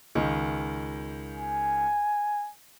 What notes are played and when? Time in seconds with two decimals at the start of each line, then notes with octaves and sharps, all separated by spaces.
0.15 C#2 D#3
1.34 G#5